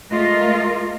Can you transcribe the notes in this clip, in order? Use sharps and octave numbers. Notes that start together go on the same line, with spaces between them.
G#3 A3 F4 A#4 D#5